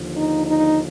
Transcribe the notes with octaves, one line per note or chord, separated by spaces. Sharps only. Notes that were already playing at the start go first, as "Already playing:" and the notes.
Already playing: D#2 D3 F3
D#4
D#4